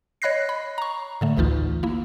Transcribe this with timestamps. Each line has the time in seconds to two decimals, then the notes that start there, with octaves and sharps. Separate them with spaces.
0.22 C#5 D#5 B5 F#6 A#6 C7
0.49 B5
0.78 A#5 C#6
1.21 A2 D3 A3
1.37 G#1 D2 E3 D#4 F4
1.83 A#3 E4